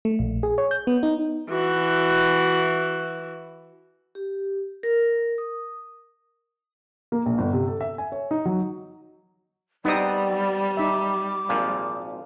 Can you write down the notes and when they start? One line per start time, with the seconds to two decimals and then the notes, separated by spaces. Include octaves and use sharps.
0.05 A3
0.19 A#1
0.43 G#4
0.58 C#5
0.71 G6
0.87 B3
1.03 D#4
1.50 E3 F#4
4.15 G4
4.83 A#4
5.38 D#6
7.12 A#3
7.26 A#1
7.38 G1
7.53 C3
7.68 A4
7.81 E5
7.98 G#5
8.12 C#5
8.31 D#4
8.45 F#3
9.85 G3 B3 C4 D#4 D5 D#6
10.77 D#4 E5 D6
11.49 G#1 A#2 F3